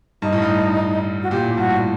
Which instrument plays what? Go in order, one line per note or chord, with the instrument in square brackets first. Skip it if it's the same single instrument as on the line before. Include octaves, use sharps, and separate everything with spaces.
[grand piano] G2 [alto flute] D#4
[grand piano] A2
G2
[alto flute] F#4
[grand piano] A#2 [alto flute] G4
[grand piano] A2
[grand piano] G2 [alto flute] F#4
[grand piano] A2